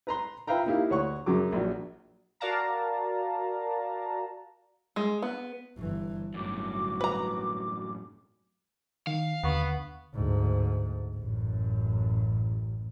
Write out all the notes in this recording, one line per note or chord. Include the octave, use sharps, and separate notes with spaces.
B4 A#5 C6
F4 B4 E5 F5 G5 A#5
A#3 D#4 E4 G4 F5
D2 C#5 F#5 C#6
F#2 C#3 F#3 D6
A#1 F#3
F#4 A#4 D5 F5 A5 A#5
G#3
B3
G1 E3
G1 F#2 A2 F#4 D6
B4 A#5
D#3 F5
D#2 D3 B3 C#6
D2 G#2
A1 F#2